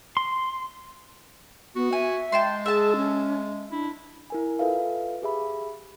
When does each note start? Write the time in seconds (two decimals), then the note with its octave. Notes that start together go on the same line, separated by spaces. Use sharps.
0.17 C6
1.76 B3 F#4
1.93 E5 G#5
2.32 G#3 G5 A5 C6
2.66 G#4 E5 A5
2.96 C#4
3.71 D4 E4
4.30 E4 A#4 G#5
4.59 F4 A4 B4 E5 F5
5.22 G4 G#4 E5 B5